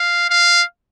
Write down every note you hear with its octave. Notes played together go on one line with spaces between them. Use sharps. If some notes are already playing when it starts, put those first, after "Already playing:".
Already playing: F5
F5